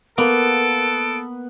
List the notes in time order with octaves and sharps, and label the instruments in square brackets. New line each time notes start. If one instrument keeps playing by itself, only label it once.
[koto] A#3 [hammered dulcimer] B3 [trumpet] A4 [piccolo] D7